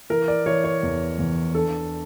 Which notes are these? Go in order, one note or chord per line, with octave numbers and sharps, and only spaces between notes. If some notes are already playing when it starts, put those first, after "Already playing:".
E3 A#4
D5
E3 C#5
C#5
E2
E2
D4 A4